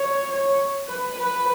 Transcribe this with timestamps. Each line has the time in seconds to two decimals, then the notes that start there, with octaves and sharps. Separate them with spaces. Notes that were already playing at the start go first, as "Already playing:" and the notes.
Already playing: C#5
0.30 C#5
0.88 B4
1.18 B4